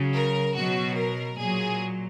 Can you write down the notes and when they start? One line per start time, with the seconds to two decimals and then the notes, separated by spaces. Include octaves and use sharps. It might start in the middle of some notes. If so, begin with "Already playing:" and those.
Already playing: C#3 F#3
0.13 A#4
0.55 B2 F#3 F#4
0.96 A#4
1.37 A#2 F#3 G#4